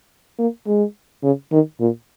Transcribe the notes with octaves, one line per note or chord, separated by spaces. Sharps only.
A#3
G#3
C#3
D#3
A#2